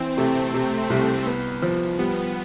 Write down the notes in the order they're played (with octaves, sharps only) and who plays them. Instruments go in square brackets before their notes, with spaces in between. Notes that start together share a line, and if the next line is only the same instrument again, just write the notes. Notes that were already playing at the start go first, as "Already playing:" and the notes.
Already playing: [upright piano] E3 [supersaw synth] C4
[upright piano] C3 [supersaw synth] A3
[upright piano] C3
C2
B3
F3
[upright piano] G3 [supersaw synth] B3